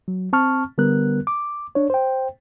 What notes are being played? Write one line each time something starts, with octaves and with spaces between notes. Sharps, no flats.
F#3
C4 A5 C#6 F6
D3 G3 B3 A#4 F#6
D6
D4 C#5
C5 G5